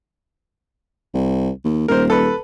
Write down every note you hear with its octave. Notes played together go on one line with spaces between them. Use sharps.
C2
D#2
D#1 A#4 C5
A4 B4